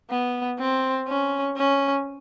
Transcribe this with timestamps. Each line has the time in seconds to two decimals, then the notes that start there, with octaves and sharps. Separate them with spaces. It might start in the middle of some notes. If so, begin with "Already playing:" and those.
0.11 B3
0.60 C4
1.08 C#4
1.57 C#4